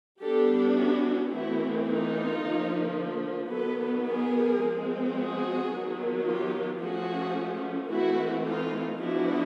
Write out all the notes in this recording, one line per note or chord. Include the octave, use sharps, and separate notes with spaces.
G3 B3 D4 G4 A4
E4 F#4
E3 A3 C4 E4 F#4
D#4 F4
D3 F3 A#3
D#3 F#3 B3 A4 B4
G#4 A#4
F3 G#3 C4
F#4 G#4
D#3 F#3 B3
F4 G4
F3 A3 C#4 F#4 G#4
E3 A3 C4 E4 F#4
D#4 F4
F3 G#3 B3 D4 E4 F#4